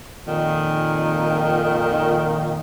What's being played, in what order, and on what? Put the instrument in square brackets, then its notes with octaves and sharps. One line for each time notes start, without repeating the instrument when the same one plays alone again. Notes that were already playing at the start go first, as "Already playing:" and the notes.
[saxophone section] F2 A#2 D#3